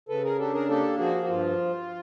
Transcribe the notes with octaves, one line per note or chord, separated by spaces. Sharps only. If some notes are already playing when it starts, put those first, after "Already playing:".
C#3 A4 B4
G#4 A#4
D4 G4 A4
G#4 A#4
A#3 G4 A4
F3 F#4 G#4
F#4
G2 F4